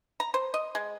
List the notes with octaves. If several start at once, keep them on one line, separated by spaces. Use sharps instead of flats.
A#5
C5
D#5
G#3